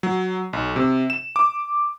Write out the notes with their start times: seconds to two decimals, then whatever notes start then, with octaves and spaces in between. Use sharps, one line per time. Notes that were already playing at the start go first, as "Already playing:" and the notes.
0.03 F#3
0.53 B1
0.76 C3
1.10 E7
1.36 D6